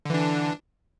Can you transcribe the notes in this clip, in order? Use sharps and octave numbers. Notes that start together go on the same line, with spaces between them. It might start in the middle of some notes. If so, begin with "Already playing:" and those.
D3 E3 D4